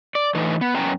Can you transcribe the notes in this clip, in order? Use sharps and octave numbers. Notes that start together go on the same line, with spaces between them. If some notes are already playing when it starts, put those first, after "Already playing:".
D5
E3 A3 D#4
B3
F#2 B3 C#4 G5 A#5